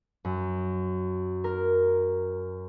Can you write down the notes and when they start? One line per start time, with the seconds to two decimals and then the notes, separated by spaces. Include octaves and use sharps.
0.25 F#2
1.44 A#4